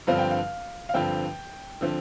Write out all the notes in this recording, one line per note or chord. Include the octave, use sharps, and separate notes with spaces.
G2 D3 F3 C4 F5
G5
F5
F5
G2 D3 F3 C4 G5
D3 F3 C4